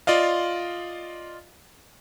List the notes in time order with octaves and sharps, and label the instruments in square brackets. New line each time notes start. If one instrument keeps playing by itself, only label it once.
[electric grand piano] F4 D5 D#5 F5